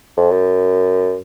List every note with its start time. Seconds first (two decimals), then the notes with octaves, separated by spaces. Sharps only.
0.17 F2
0.31 F#2